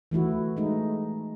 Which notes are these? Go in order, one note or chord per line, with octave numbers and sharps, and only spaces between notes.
E3 A3 E4 F#4
G#3 A3 D#4